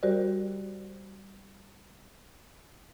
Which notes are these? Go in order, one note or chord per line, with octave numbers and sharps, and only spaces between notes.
G3 F#4 G4 A#4 C5 D5